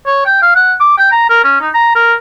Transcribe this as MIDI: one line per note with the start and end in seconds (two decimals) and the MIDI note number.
0.06 0.23 73
0.25 0.37 79
0.42 0.55 77
0.55 0.73 78
0.80 0.95 86
0.97 1.09 79
1.11 1.25 82
1.29 1.41 70
1.44 1.60 61
1.61 1.69 63
1.74 1.94 82
1.95 2.14 70